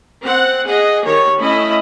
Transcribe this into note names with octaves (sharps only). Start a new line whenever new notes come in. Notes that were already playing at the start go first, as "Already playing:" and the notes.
C4 F#5
G#4 D#5 F#5
D#3 G4 C#5
A3 C#4 E4 D#5 B5